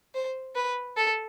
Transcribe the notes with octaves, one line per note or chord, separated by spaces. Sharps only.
C5
B4
A4